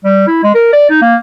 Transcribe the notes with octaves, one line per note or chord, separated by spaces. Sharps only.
G3
E4
G#3
A#4
D5
D#4
A#3